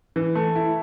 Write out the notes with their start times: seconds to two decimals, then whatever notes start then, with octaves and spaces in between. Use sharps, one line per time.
0.16 E3
0.35 A3
0.56 E4